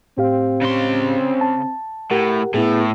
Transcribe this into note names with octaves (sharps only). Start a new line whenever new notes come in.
A2 C4 G4 F5
C#3 C6
A5
A2 G4 A#4 F#5
A2 B3 E4 G#4